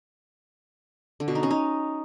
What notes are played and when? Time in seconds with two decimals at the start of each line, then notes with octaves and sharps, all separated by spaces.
1.20 D3
1.28 B2
1.35 D#4
1.43 C#4
1.51 D#4